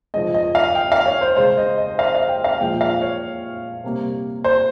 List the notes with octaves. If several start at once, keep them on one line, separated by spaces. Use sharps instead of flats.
C#3 F3 G#3 D#5
D#5
F5
G5
F5
C#5
C5
C#3 G#3 C5
D#5
D#5
F5
F5
G5
F5
A#2 F3 G#3 G5
F5
C#5
C3 G3 A#3
C5